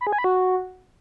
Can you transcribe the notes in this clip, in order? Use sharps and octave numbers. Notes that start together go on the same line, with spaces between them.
B5
G#4
G#5
B5
F#4